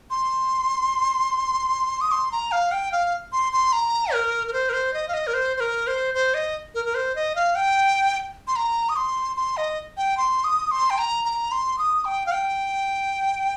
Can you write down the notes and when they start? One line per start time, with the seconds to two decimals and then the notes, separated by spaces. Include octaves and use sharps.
0.10 C6
2.01 D#6
2.12 C6
2.32 A#5
2.52 F5
2.72 G5
2.92 F5
3.32 C6
3.53 C6
3.73 A#5
4.13 A#4
4.47 A#4
4.53 C5
4.69 A#4
4.73 C5
4.94 D#5
5.08 F5
5.14 D#5
5.27 A#4
5.34 C5
5.57 C5
5.60 A#4
5.87 C5
6.14 C5
6.34 D#5
6.75 A#4
6.86 A#4
6.95 C5
7.15 D#5
7.36 F5
7.55 G5
8.48 C6
8.56 A#5
8.89 D#6
8.96 C6
9.37 C6
9.57 D#5
9.97 G5
10.17 C6
10.44 D#6
10.71 C6
10.90 G5
10.98 A#5
11.25 A#5
11.52 C6
11.79 D#6
12.05 G5
12.26 F5
12.32 G5